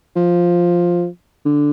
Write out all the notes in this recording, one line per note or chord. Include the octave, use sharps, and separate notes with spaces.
F3
D3